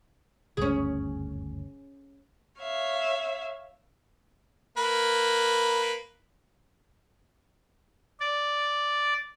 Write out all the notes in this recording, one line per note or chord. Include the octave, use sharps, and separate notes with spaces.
F#1 D2 G2 C#4 G#4
C#5 E5 F5
A#3 B4
D5